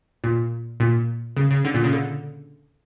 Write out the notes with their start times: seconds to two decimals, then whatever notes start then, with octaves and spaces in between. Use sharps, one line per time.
0.24 A#2
0.80 A#2
1.37 C#3
1.51 C#3
1.65 D3
1.74 A#2
1.84 C#3
1.93 D3